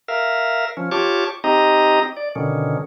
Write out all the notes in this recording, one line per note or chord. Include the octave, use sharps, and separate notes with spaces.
A#4 E5 F5
F3 C#4
F4 G4 C#5 A5 C#6 D6
C4 D#4 G4 D#5 A#5
D5
B2 D3 D#3 C#4